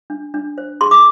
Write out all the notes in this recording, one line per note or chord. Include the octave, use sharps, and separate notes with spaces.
D4
D4
C5
G#4 C6
D6